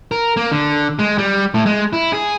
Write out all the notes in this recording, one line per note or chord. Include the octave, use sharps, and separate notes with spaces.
A#4
A#3
D3
G#3
G3
A2
G#3
E4
G#4